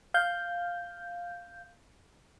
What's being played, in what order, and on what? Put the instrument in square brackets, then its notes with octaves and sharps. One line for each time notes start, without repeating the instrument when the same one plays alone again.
[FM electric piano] F5 G6